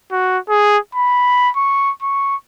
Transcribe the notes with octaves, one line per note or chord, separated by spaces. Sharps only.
F#4
G#4
B5
C#6
C#6